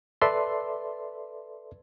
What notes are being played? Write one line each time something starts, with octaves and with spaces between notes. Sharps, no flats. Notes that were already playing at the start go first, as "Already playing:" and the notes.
A4 B4 D5 E5 C6